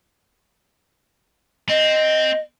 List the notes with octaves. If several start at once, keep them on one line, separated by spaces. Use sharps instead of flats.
C4 D#5